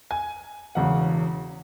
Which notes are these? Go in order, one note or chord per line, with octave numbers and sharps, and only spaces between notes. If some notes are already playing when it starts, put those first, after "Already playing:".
G#5
E1 E2 C#3 F#5